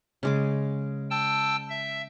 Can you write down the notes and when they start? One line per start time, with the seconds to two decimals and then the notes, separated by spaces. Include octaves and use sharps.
0.23 C#3 G#3 D6
1.10 G5 A5 E6
1.70 E5